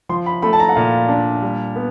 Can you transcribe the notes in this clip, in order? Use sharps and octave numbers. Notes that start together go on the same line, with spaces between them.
F3 C6
B5
A3 B5
A5
A#5
F#5
A#2 F5
D4
G3
B3